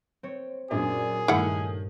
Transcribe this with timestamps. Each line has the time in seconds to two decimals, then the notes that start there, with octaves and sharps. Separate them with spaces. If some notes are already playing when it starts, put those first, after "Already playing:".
0.23 C4 C#5
0.71 F#2 A#2 D4 G#4 D5
1.28 G2 D#3 A3 E4 F#5